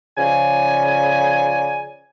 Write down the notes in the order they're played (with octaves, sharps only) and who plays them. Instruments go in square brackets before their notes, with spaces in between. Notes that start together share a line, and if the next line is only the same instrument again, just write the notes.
[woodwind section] C#3 F3 D5 G#5